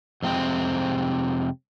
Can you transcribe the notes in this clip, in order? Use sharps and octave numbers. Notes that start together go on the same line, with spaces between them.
F2 C3 G#3 C4